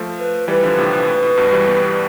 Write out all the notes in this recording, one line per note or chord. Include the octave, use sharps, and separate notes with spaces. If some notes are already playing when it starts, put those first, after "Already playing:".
Already playing: F3 A3
B4
E3 G3 B4
D3 F3
A2 C3
A2
A2
A2
G2 B2
E3 G3
G3 B3